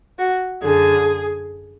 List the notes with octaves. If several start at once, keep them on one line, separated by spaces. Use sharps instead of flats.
F#4
F#2 D3 G#4